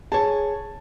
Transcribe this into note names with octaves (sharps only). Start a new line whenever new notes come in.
G#4 C#5 A5